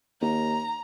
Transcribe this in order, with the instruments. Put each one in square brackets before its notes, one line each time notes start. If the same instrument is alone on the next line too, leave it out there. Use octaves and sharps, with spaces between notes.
[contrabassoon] D#2 [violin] A#5